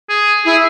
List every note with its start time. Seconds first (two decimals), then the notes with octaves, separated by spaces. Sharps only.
0.10 G#4
0.45 E4 G#4